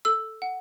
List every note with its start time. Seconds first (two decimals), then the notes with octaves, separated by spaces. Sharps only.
0.05 A4 E6
0.42 F#5